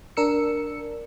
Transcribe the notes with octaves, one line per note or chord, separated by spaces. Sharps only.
D4 A#4 E6 C#7